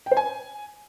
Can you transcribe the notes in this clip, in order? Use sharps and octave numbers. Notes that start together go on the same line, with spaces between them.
G5
C5
G#5